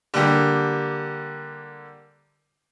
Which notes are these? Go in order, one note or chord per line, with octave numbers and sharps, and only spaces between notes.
D3 G3 A#3 G4